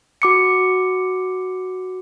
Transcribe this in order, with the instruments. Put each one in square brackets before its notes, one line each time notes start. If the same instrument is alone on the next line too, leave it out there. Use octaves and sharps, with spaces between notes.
[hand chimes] F#4 D6 C#7